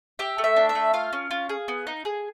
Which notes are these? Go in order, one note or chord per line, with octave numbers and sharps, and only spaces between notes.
G4 E5
A3
E5
D4
E5
A3
F4 F5
C#4
F4
G#4
B3
D#4
G#4